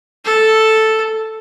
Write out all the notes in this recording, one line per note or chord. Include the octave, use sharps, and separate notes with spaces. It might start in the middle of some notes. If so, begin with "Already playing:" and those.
A4